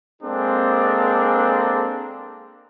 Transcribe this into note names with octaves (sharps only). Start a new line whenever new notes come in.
G#3 A#3 C4 D4 G#4 A4